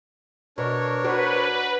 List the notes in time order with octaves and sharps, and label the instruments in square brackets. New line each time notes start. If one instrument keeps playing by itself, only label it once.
[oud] B2 [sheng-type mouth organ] D4 A#4 C#5
[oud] F#4 C5 D5 [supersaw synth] B4